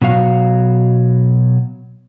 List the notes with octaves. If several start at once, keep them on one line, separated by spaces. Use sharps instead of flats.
B2 F#3 F#4 F5